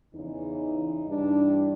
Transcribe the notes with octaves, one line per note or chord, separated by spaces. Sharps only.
E2 C#3 E3 D#4
G2 E3 D4